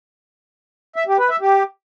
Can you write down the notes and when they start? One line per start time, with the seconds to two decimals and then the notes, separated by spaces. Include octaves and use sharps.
0.96 E5
1.07 G4
1.18 B4
1.30 E5
1.41 G4